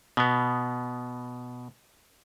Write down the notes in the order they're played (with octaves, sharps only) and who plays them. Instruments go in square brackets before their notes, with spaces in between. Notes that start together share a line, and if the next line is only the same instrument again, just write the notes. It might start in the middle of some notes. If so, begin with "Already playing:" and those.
[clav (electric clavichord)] B2 B3